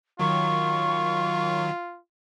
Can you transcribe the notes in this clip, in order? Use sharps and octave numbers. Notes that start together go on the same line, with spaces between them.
D#3 F#3 F4 C#6